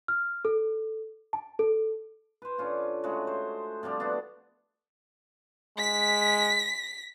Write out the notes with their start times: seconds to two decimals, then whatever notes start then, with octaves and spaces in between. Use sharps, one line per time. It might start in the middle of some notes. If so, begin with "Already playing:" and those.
0.08 F6
0.45 A4
1.33 A5
1.59 A4
2.42 B4 C5
2.58 D3 C#4 F4
3.03 C#3 G#3 A3 F#4
3.27 C5
3.83 C3 F3 G3 D4
4.00 B3 D4 E4 F#4
5.78 G#3 B6